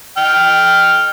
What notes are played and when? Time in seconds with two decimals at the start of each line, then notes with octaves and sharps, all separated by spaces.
0.17 G5 F6